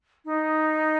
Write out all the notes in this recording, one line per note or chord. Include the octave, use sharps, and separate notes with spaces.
D#4